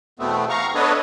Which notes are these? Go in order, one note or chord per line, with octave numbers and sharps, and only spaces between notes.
E2 B2 A3 B3 C4
F5 A#5 C#6
B3 D4 A4 B4 C#5 D#5